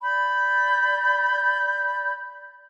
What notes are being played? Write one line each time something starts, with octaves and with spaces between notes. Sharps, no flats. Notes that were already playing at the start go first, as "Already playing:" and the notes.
D5 B5 G6